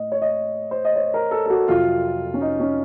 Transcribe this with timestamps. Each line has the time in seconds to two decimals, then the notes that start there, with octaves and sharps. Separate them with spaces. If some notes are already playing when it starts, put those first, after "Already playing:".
Already playing: A2 D#5
0.12 C#5
0.22 D#5
0.71 C5
0.85 D#5
0.96 C#5
1.14 A#4
1.31 A4
1.46 A4
1.50 F#4
1.68 F2 C3 F#3 F4
2.34 C#4
2.41 D#4
2.60 C#4